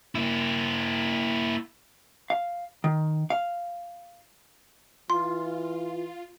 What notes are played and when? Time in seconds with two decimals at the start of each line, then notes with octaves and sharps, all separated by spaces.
0.15 A#3 E4
2.30 F5
2.84 D#3
3.30 F5
5.10 E3 F4 C6